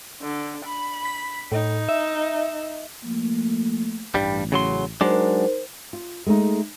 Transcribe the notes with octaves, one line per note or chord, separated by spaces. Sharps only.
D3
B5
B6
A2 D#4
E5
F3 A3 A#3
A1 G2 G3
C#3 F#3 C6
F#3 G#3 D4 D#4 A#4 C5
F4
G#3 A3 B3 D#4